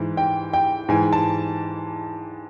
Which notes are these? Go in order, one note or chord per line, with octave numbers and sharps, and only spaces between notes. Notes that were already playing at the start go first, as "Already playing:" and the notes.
Already playing: G#2 E3
G5
G5
G#2 E3 G#5
A5